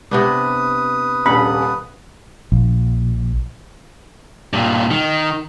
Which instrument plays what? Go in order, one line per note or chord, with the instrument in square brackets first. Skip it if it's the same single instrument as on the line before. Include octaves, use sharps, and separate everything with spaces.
[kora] C3 B3 D4 [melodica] B4 D#6
[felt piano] D#1 A#1 [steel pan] B5
[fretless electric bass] A#1
[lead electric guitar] G2 A#2
D#3